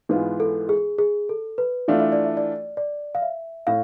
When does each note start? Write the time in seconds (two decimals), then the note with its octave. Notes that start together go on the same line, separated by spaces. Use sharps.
0.09 G#2 E3 G#3 B3 F4
0.40 A4
0.69 G#4
0.99 G#4
1.29 A4
1.58 B4
1.88 E3 A3 D4 F4 D5
2.00 E5
2.12 D5
2.25 E5
2.37 D5
2.77 D5
3.15 F5
3.22 E5
3.67 A2 F5